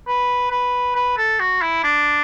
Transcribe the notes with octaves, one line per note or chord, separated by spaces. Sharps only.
B4
B4
B4
A4
F#4
E4
D4